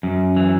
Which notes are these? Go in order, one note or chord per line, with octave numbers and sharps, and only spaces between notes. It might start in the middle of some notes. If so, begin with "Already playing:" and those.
F#2
E3